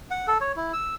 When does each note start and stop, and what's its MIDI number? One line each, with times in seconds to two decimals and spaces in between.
0.11 0.26 78
0.28 0.38 69
0.41 0.52 73
0.56 0.72 64
0.73 0.95 88